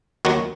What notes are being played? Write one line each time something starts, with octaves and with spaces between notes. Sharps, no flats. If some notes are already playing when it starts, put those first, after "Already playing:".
D#2 D#3 F#3 F#4